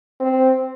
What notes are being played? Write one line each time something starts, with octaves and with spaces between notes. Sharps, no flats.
C4